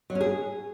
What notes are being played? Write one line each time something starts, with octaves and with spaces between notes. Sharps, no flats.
F#3
C#4
G#4